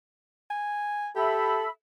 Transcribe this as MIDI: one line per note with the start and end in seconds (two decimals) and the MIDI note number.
0.50 1.09 80
1.16 1.64 67
1.16 1.66 69
1.16 1.69 76
1.16 1.69 83
1.16 1.69 88